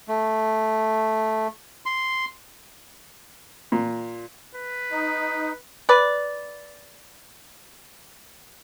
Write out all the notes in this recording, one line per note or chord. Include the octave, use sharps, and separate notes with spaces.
A3
C6
A#2
B4
D#4
B4 D5